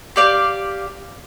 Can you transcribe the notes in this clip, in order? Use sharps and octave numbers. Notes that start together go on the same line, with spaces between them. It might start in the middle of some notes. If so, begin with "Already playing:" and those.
G4 D5 F5